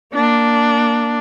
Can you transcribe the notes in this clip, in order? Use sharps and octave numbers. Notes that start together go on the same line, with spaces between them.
A#3 D4